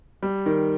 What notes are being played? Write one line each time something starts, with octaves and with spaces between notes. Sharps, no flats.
G3
D#3